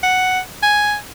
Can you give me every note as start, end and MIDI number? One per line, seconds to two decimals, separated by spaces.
0.03 0.40 78
0.63 0.95 80